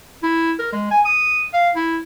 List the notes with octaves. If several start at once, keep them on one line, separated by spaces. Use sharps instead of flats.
E4
A#4
G#3
G#5
D#6
F5
E4